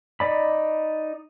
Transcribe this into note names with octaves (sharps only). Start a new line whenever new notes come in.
D#4 D5 B5